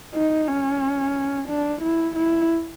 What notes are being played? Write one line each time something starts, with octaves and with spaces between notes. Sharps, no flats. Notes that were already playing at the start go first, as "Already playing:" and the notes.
D#4
C#4
D4
E4
E4